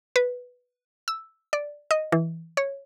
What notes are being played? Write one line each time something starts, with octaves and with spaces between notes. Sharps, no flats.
B4
E6
D5
D#5
E3
C#5